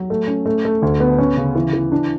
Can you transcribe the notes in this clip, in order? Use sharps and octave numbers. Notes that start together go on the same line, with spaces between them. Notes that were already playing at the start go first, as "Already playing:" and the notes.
Already playing: F#3
A3
C#4
A3
A3
D2
B3
C#4
C#3
E3
E3
D4